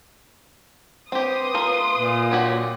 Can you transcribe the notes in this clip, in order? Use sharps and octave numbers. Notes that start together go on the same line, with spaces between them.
C4 G4 B4 C6 D#6
A3 F4 A#4
A#2
F#4 G4 C#5